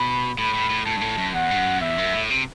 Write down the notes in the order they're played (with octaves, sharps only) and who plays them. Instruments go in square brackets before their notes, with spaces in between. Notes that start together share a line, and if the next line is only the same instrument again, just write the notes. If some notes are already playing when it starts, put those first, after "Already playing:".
Already playing: [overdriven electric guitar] B2 [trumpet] B5
[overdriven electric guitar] A2 [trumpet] B5
[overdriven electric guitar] A2
A2
[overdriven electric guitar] A2 [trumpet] A5
[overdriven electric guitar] G2
A2
F#2
[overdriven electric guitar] E2 [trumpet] F#5
[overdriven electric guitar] G2
F#2
[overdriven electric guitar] E2 [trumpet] E5
[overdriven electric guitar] F#2
A2
C3